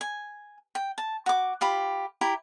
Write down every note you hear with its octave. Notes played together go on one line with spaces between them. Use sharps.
G#5
G5
A5
F#4 D6
F4 G4 B5
E4 G4 A#5